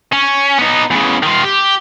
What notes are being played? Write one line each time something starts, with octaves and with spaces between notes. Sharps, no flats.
C#4
B3 D#4
E2 C#3
D#3 F4
G4